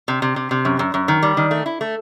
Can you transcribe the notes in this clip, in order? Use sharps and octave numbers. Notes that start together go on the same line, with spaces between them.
C3
C3
C3
C3
F#2
F#2
F#2
D#3
G3
D#3
A3
E4
A3